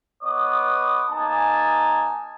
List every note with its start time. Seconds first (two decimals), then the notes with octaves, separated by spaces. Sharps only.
0.23 B3 B4 C#5 D#5 D6 D#6
1.10 A#3 D#4 G#5 A5